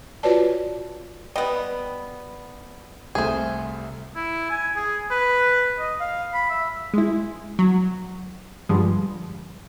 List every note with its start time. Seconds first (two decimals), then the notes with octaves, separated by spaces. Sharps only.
0.23 F4 F#4 B4 C#5 D5 A5
1.36 G3 B3 D#5
3.15 C2 A3 G#4 C5
4.16 E4
4.50 G#5
4.76 G#4
5.11 B4
5.79 D#5
6.00 F5
6.34 B5
6.50 E5
6.94 G#3 E4
7.59 F#3
8.69 G2 D3 F3 G3 G#3